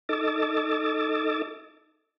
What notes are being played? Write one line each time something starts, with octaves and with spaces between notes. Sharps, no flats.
D#4 A4 D#5 D6 E6 A6